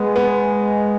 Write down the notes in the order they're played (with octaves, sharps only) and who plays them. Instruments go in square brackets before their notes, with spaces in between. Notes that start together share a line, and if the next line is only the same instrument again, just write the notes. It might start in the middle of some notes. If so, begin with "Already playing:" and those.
Already playing: [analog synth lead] G#3 [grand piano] B3
[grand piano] B3